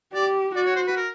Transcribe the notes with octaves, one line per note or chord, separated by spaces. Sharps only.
G4 D5
F#4 D5
C#5
C5
B4
A#4